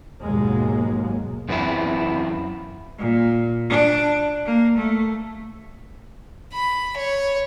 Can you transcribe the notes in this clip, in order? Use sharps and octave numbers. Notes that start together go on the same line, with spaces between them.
D#2 G#2 B2 F#3 G#3 A#3
F#2 E3 B3 C4 E4
A#2
D4
A#3
A3
B5
C#5